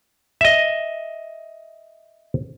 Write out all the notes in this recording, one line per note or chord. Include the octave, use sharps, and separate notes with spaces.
D#5 E5